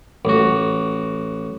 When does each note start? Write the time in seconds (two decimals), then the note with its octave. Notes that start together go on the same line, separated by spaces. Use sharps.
0.25 A1 F#4